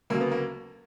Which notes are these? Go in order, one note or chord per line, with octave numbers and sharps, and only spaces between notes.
D2 C#3 F#3 A#3
B3
A#3